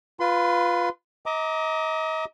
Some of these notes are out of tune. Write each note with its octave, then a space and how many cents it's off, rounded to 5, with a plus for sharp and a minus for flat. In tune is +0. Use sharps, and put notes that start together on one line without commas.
F4 +5 B4 +0 C6 -35
D#5 +35 A#5 +0 D6 +0